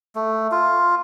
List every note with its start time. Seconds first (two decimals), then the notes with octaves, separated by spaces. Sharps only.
0.15 A3
0.51 F4